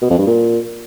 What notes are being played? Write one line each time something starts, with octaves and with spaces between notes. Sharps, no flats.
B2
F2
G2
A#2